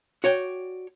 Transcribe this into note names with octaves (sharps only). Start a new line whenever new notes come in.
F#4 C#5 D5 G5